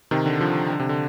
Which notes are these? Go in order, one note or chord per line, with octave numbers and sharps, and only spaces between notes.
C3 D#3
D3
D3 F3
D3
C3
D3